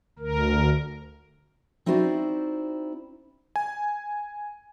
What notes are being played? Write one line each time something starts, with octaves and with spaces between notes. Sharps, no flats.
D2 A#4
C4 D#4 E4 F#4 C5 D5
G#5